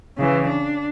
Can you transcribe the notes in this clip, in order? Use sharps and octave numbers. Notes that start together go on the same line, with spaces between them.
C#3 E3
D4